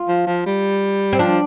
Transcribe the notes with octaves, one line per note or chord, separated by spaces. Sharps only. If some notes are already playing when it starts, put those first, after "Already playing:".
Already playing: F4
F3
F3
G3
C4
F3 D4